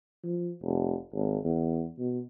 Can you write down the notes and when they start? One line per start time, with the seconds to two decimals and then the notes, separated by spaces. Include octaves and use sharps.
0.24 F3
0.62 F1
1.14 G#1
1.44 E2
1.99 B2